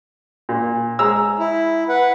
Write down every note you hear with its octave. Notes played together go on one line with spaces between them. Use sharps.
A#2
G#3 A#5 E6
E4
B4 F#5